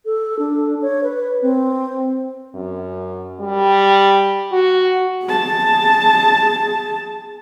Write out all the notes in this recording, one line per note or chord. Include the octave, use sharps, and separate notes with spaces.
A4
D4
C#5
B4
C4
F#2
G3
F#4
G#4 A5